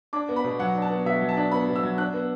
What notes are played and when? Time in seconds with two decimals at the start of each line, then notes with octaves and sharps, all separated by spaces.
0.13 D4 D6
0.29 B3
0.36 B5
0.44 B2
0.59 F#3 F#5
0.75 D4
0.82 A5
0.90 B3
1.05 B2 E5
1.21 F#3
1.29 A5
1.37 D4
1.51 B3 B5
1.68 B2
1.76 E6
1.83 F#3
1.98 D4 F#6
2.14 B3